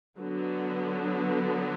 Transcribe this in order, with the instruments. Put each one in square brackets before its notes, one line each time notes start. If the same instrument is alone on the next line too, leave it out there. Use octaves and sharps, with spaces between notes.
[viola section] D3 F#3 B3